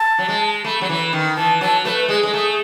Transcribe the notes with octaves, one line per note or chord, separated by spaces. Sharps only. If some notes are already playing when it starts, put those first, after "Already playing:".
Already playing: A5
F#3
G#3
A3 B5
F#3
E3
D#3
E3 A5
F#3 A5
A3 B4
G#3 G#4
G#3
A3